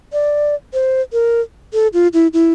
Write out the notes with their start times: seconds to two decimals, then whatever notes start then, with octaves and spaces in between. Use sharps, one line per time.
0.13 D5
0.73 C5
1.13 A#4
1.73 A4
1.94 F4
2.13 E4
2.33 E4